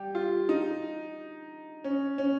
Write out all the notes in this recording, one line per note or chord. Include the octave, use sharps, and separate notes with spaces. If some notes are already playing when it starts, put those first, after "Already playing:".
Already playing: G3 G4
F4
D#4
C#4
C#4